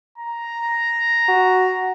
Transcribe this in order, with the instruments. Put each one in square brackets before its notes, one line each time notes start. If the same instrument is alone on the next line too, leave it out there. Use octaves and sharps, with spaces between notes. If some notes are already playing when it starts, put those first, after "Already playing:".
[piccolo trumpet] A#5
[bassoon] F#4